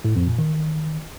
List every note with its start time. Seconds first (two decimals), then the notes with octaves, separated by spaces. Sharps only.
0.05 A2
0.16 F2
0.27 A#2
0.38 D#3